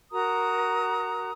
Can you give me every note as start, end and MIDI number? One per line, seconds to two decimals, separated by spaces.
0.12 1.31 66
0.12 1.31 70
0.12 1.31 82
0.12 1.31 87